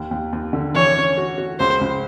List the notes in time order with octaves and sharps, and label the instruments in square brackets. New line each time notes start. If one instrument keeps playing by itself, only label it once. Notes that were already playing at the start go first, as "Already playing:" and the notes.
Already playing: [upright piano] D#2
D#2
D#2
D3
[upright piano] E3 [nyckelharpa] C#5
[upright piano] C#4
F#4
F#4
[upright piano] C#2 [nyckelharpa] C5
[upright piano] C#2